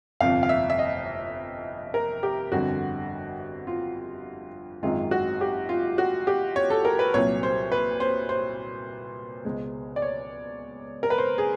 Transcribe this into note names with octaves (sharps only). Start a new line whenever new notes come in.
G1 F2 C3 F3 F5
F5
E5
E5
D#5
A#4
G4
G1 F2 D3 G3 F#4
F4
G#1 F#2 D#3 G#3 F4
F#4
G4
F4
F#4
G4
C#5
A4
A#4
B4
C2 A#2 F#3 C#5
C5
B4
C5
C5
C#2 B2 G#3
D5
C#5
A#4
B4
C5
G#4